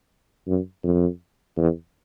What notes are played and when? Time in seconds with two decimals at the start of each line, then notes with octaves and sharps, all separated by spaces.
0.47 F#2
0.84 F2
1.57 E2